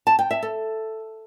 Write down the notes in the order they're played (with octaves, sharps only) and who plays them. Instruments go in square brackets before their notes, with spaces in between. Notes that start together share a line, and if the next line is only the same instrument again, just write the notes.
[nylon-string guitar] A5
G5
E5
A4